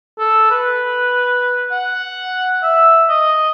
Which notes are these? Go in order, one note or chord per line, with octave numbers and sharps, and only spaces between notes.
A4
B4
F#5
E5
D#5